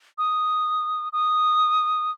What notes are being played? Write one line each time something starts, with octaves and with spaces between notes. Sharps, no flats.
D#6
D#6